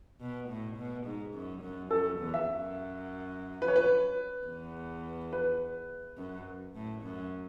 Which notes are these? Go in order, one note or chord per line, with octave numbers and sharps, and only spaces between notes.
B2
A2
B2
G#2
F#2
F#2
F#2 A4
E2
E5
F#2
B4
C#5
B4
E2
B4
F#2
A2
F#2